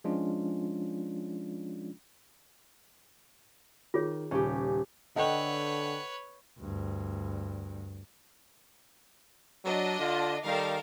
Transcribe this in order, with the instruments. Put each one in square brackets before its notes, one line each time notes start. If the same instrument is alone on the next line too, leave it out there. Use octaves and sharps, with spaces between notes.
[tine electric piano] F3 G#3 C#4 D4 F4
[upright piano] D#3 [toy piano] F4 G#4 C#5
[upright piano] D#1 C#3 [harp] C#4 G4
[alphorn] D3 [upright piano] A4 F#5 [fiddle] B4 C#5 [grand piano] D#5 G5
[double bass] D2 G2
[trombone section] F#3 [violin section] D4 D#5
[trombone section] D3 F4
[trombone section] D#3 G3 [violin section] A4 A#4 F5